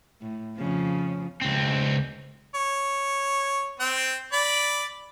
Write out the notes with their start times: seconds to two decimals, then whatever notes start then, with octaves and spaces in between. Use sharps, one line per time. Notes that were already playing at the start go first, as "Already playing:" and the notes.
0.21 A2
0.56 F2 C#3 F3
1.41 C#2 C4
2.55 C#5
3.80 C4 G5
4.33 D5 B5